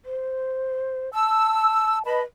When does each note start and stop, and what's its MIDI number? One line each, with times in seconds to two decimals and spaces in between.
0.05 1.10 72
1.14 2.05 81
1.14 1.98 88
2.05 2.22 71
2.05 2.22 75
2.05 2.22 81
2.05 2.22 83